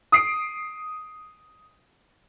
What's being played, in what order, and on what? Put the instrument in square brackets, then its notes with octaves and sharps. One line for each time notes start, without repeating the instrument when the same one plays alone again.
[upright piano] D#6 C7 D7